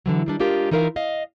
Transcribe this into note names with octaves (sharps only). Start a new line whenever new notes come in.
D3 E3 F#3
D#3 G3 D4
G#3 D4 F4 G4 A#4
E3 D#4 F4 A#4 E5 F5
D#5 F5